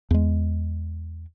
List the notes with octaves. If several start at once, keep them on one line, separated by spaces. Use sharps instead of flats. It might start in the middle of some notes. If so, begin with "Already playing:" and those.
E2 G#3